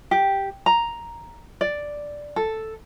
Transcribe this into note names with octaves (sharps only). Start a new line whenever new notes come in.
G4
A#5
D5
A4